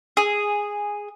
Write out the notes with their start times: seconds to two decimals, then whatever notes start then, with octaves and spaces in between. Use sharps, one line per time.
0.17 G#4